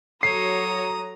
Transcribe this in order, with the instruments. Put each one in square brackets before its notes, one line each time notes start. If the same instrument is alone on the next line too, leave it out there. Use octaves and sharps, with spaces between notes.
[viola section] F#3 A#5 [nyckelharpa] A4 C#5 [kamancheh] D#6 [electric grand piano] C7